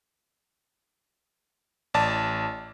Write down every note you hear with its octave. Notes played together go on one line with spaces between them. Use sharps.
A1 D5 A5